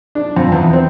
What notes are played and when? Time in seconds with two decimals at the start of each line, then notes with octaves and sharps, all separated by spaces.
0.15 D4
0.37 F2
0.52 E2
0.73 C4